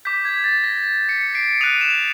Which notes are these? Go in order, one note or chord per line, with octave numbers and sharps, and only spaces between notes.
D6 G6 B6
G#6
A6
A#6
B6 C#7
C7 D7
D#6 F#6 D#7 F7
E7
F7